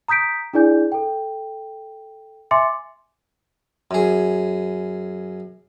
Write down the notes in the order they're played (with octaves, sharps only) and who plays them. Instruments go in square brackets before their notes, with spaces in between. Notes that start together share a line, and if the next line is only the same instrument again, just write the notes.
[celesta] A#5 D#6 G6 B6 D7
D4 E4 G#4 D5 G#5 G6
A4 G5
E5 G#5 C6 D6 A6 C#7
[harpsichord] F#2 G#4